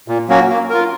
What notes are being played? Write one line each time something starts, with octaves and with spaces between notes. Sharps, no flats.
A#2
F#3 A#3 C#4 F#4
A#3
F4 A#4